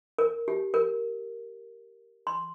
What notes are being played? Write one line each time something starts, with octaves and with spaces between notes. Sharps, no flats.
A#4
G4
A#4
C6